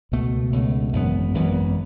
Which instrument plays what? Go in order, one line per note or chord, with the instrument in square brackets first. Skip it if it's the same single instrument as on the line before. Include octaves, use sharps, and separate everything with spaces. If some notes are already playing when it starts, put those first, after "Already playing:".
[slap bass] C#2 B2 A3
C#2 B2 A3
G#1 F#2 E3 B3
G#1 F#2 E3 B3